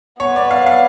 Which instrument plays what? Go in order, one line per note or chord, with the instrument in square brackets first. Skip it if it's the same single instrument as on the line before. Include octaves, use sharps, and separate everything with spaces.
[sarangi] B3 [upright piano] C#5
[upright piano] D5
F5
F5